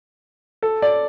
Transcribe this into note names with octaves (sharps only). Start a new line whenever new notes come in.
A4
D5